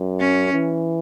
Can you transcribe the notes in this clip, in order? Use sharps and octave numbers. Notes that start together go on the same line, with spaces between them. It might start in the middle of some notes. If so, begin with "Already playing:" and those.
Already playing: F#2
C#4
E3